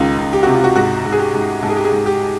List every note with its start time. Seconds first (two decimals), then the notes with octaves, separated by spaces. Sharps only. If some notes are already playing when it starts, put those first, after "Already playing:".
Already playing: C#2 D#3 D#4 F4
0.18 C#2
0.33 G4
0.43 C3 F#4
0.54 F4
0.64 F#4
0.76 G#2 F#4
1.05 G#2
1.12 G#4
1.19 G4
1.34 G#2
1.63 G#2 A4
1.69 G#4
1.76 G4
1.85 G#4
1.92 G#2
2.06 G4